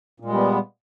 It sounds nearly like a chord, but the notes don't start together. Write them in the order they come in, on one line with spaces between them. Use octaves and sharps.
A#2 G#3 G3 B3